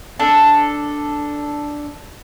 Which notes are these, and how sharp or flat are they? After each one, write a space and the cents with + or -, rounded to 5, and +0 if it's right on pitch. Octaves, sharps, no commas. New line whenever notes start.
D4 +0 A4 +0